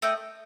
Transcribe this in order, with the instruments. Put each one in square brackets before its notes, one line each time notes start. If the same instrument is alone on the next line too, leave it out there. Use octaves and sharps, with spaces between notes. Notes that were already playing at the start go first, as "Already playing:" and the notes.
[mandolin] A3 D#5 G5